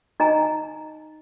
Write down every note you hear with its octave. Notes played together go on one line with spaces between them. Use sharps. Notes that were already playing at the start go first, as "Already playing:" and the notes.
D#4 D#5 G#5 A#5